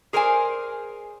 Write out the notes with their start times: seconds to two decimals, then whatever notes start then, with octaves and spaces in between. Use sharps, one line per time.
0.13 G#4 A#4 C5 D5 G#5